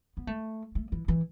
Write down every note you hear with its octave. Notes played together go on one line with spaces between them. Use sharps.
B3
A3
A3
E3
E3